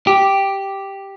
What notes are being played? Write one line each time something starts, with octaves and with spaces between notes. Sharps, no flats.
G4